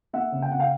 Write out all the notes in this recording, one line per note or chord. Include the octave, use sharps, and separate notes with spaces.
A#3 E5 F#5
C#3
G5
C#3 F#5
F5 G5